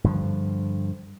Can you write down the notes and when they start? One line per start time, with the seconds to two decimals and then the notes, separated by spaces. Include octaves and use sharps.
0.04 G2 D3 F3